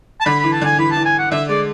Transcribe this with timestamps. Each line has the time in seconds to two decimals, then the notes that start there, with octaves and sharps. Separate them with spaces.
0.21 A5
0.25 D3 B5
0.39 B5
0.44 E3
0.52 A5
0.61 D3 G#5
0.78 E3 B5
0.91 A5
0.96 E3
1.05 G#5
1.19 F#5
1.31 D3 E5
1.49 G#3 D5